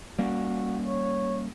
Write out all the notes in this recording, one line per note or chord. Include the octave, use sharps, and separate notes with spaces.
G3 A#3 C#4 F#4
C#5